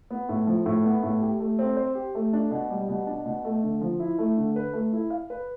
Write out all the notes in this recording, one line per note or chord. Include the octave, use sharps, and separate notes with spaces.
B3
A2
F3
A2
B3
A2
G4
A3
C4
C5
G4
A3
D4
B2
G3
B2
D4
B2
A3
D3
F3
E4
A3
D3
B4
A3
E4
F5
B4